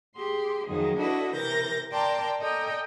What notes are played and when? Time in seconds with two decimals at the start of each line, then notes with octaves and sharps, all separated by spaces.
0.16 G4 G#4 C6
0.66 F2 D#3 F#3 G#4
0.97 D4 E4 F#4 A4 B4 D#5
1.35 C3 E3 A#4 G6 A6 A#6
1.91 A#4 D5 G5 A5 A#5 C6
2.39 A4 D5 D#5 G5 G#5 A#5